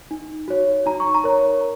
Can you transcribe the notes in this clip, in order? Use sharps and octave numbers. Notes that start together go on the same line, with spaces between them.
D#4
F#4 C#5
D#4 A#5
C#6
A#5
A#4 C#5